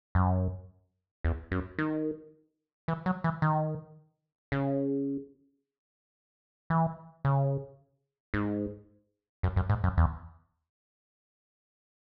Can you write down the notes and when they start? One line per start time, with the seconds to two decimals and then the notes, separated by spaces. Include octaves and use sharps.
0.15 F#2
1.24 E2
1.52 F#2
1.79 D#3
2.88 E3
3.06 F#3
3.24 E3
3.42 D#3
4.52 C#3
6.70 E3
7.25 C#3
8.34 G#2
9.43 F#2
9.56 F#2
9.70 G#2
9.84 F#2
9.97 E2